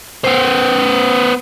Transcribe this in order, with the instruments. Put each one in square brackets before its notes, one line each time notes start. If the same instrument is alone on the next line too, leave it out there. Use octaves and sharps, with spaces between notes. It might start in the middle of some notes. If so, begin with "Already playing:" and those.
[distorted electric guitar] B3 C5